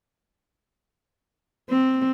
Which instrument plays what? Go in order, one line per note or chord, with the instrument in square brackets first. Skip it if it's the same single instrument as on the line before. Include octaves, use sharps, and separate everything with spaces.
[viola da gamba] C4